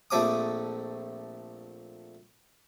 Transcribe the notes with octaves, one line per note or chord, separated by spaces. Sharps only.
A#1 A3 C4 D6 D#6